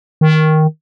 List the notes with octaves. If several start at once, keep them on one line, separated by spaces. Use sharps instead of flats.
D#3